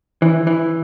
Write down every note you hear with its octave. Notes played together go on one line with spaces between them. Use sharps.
E3
E3